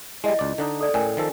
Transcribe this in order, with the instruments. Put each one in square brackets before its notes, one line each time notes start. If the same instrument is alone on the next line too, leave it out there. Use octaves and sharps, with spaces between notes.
[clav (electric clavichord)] G3 G#3 [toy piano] E4 D#5
[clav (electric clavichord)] C#2 D5
D3 D4 D#4
[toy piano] A4 D5
[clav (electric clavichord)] A2 [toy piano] C#4 A#4 G#5
[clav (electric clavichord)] D#3 F3 A4